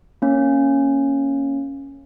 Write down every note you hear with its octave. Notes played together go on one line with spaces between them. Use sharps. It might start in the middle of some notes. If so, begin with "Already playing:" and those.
A#3 C#4